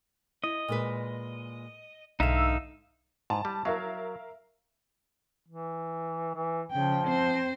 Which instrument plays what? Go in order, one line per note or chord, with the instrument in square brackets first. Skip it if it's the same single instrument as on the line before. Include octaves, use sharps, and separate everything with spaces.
[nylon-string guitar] E4 [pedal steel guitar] D#5
[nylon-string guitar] A#2 G#3 B4
[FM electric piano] B1 E6 [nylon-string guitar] G#2 D3 [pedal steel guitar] D#4 E5 F5
[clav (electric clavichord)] G#2 [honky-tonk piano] A5
[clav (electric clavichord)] G3
[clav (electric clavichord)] F#3 [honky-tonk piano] A#4 E5 F5
[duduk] E3
E3
[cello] C#3 G5 [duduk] F3
[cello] C4 C5